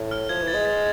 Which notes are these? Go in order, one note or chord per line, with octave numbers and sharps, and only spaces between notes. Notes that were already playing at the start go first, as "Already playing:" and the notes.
Already playing: A2
F6
F3 G#6
E3
A6
G#3
A6